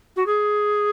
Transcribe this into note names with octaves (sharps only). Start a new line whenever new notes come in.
F#4
G#4